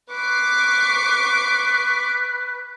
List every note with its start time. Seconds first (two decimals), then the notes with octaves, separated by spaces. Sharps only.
0.10 B4 C#6 D6 C7